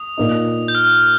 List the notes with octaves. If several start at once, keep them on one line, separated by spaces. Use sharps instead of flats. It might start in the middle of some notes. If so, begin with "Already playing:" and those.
Already playing: D#6
A#2 A#3 D#4
G6
F6